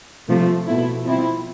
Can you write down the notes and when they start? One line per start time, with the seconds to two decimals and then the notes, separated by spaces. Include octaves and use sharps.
0.29 C3 F3 A3
0.67 B2 A3 E4
1.06 F3 C4 E4